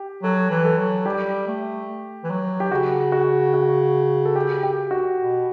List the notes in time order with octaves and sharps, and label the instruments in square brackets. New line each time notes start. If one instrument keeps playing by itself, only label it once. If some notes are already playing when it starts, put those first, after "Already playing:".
Already playing: [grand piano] G4
[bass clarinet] F#3 [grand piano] A4
[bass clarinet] E3
[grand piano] A4
[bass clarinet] F#3
[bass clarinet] G3 [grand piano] G4
[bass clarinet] A3
E3
F#3
[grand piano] G4
[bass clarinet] C#3 [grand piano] F#4
[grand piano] F#4
F#4
A4
G4
G4
F#4
[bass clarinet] B2